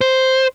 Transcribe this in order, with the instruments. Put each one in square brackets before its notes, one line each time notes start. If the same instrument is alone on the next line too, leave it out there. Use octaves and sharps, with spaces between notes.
[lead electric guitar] C5